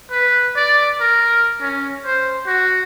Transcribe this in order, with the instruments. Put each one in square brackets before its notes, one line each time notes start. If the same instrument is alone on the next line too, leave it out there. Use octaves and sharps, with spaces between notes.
[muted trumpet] B4
D5
A#4
C#4
C5
F#4